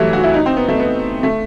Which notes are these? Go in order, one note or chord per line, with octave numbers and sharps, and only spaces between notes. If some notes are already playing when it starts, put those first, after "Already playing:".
Already playing: E3 F#3 G3 A3
F#4
E4
D#4
C4
B3
A3
B3
A3